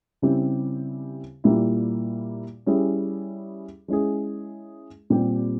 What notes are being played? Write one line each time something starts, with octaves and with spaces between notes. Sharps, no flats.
C#3 G3 C4 E4 G4
A#2 G3 A#3 E4
G3 C#4 E4 G#4
G#3 C#4 E4 G#4
A#2 G3 C4 G4